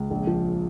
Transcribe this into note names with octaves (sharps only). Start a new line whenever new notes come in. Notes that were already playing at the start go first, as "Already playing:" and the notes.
Already playing: C#2
A#1
F3